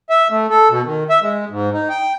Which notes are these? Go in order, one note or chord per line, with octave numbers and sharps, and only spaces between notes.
E5
A3
A4
B2
D#3
E5
G#3
G#2
D#4
G5